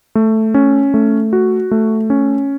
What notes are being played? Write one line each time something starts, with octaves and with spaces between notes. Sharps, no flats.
A3
C#4
A3
F#4
A3
C#4